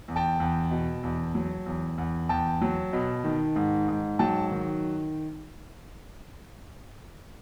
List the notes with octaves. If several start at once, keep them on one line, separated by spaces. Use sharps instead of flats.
E2
G5 A5
E2
B2
E2
F#3
E2
E2
E2 G5 A5
F#3
B2
D#3
G#2
G#2
F#3 G5 A5
D#3